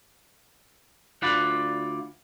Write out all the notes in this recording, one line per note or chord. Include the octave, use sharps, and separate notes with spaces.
D2 F4 D5 F#5 B5